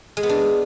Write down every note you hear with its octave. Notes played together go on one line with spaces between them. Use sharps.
G#3
B3
D4